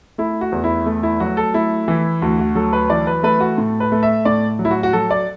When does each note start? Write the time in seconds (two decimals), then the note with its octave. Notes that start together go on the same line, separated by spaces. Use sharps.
0.18 A3 E4
0.41 F#4
0.52 E2
0.64 E4
0.86 A3
1.03 E4
1.20 F#3 F#4
1.37 A4
1.54 A3 E4
1.88 E3
2.22 D2 F#4
2.39 F#4
2.55 F#3 A4
2.73 B4
2.90 E3 D5
3.07 B4
3.23 A3 B4
3.40 F#4
3.58 A2
3.80 B4
3.92 A3
4.03 E5
4.25 A2 D5
4.59 F#3
4.65 E4
4.71 F#4
4.83 F#4
4.93 F#3 A4
5.11 D5